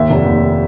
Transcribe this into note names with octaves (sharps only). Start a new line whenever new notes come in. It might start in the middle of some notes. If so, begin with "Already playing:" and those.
Already playing: D#2 E5
F1
D#2